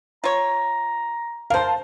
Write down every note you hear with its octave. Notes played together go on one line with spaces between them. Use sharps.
F4 C#5 A#5
A#4 C5 F5 A5